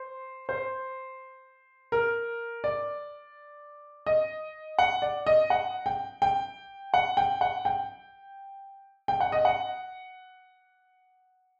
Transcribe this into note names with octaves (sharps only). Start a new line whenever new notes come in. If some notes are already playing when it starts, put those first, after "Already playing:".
Already playing: C5
C5
A#4
D5
D#5
F#5
D5
D#5
F#5
G5
G5
F#5
G5
F#5
G5
G5
F#5
D#5
F#5